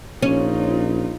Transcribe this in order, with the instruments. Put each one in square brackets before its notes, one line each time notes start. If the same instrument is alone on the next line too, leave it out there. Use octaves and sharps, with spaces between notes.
[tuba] A#1 [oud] C#4 [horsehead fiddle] D#4 F4